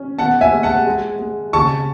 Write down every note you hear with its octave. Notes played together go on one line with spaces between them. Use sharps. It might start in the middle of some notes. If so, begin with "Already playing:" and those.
Already playing: C#4
B3 F#5 A5
E5 G#5
G#3
F#5 A5
G#3
G#3
C#3 A5 C#6